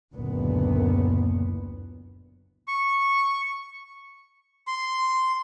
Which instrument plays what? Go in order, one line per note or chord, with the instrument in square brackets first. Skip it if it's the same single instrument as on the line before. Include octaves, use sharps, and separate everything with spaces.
[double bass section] F#1 D2 A#2 B3
[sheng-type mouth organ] C#6
C6